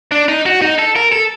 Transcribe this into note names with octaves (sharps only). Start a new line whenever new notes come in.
D4
D#4
F#4
D#4
A4
A#4
A4